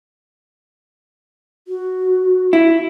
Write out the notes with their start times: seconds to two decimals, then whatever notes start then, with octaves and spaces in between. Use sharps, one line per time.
1.67 F#4
2.53 E4